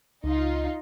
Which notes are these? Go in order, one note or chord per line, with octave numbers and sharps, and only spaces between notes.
C#2 D#4 F4